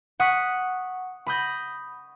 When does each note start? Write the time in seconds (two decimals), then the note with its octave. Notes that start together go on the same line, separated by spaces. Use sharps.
0.20 F#5 C#6 D#6 B6
1.27 B5 D#6 G6 A#6